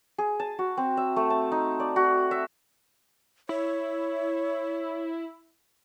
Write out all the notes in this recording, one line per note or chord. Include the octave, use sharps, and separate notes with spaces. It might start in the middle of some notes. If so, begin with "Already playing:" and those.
G#4
A5
F#4
C4
E5
A3
A5
D#4
D5
F#4
E5
E4 C#5